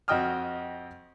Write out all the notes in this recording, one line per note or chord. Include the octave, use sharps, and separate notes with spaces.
F2 F#4 D#5 G5 D#6 F6